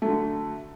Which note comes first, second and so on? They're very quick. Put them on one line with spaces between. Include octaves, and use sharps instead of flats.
A3 F#3 D3